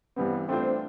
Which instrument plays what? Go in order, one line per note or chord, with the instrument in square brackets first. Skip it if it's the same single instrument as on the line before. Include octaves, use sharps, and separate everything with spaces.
[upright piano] G2 E3 G3 C4 [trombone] B3
[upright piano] A3 D4 F4 C5 [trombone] C4